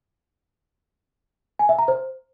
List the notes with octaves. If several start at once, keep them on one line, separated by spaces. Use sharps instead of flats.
G#5
E5
A#5
C5